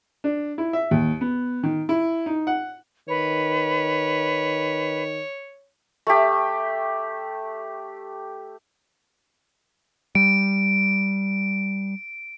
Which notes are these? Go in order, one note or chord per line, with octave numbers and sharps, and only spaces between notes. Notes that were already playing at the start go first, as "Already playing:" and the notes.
D4
E4
E5
D#2
B3
D#3
E4
D#4
F#5
D#3 B4 C#5
A3 G4
G3 D7